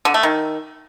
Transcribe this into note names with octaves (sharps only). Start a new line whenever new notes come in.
D3
A3
D#3